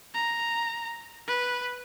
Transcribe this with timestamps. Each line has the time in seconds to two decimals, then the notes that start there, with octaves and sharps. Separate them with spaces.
0.14 A#5
1.27 B4